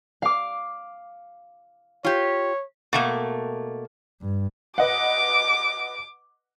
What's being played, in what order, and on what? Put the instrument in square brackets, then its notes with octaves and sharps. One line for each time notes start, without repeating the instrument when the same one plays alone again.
[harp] F5 D6
[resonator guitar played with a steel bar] F4 G4 [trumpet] C#5
[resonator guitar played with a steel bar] B2 A3 A#3
[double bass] G2
[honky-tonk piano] B4 D#5 F#5 [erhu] D6